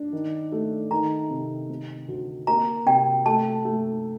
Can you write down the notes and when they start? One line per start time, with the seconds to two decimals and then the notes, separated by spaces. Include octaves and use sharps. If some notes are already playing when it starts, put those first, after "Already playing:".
Already playing: D4
0.13 D#3
0.52 A3
0.91 D#3 A#5
1.31 C3
1.70 C4
2.08 D2
2.47 A#3 A#5
2.86 C3 G5
3.26 A3 A5
3.65 A3